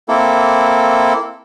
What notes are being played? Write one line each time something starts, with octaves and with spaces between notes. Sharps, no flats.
A#3 C4 E4 A4